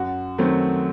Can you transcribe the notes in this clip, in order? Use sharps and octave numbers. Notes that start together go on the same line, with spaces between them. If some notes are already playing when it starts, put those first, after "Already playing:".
Already playing: F#2 F#4
D#3 F#3 A3 C4